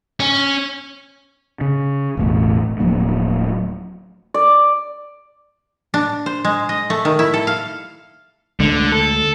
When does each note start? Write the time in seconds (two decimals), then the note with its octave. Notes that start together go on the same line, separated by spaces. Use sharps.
0.20 C#4
1.61 C#3
2.17 E1 A1 A3
2.79 D1 F3 F#3 A#3
4.34 D5
5.94 D4
6.26 C5
6.45 G#3
6.69 D#5
6.90 A3
7.05 D#3
7.19 E4
7.34 A4
7.47 F5
8.60 D2 D3 G#3
8.92 A4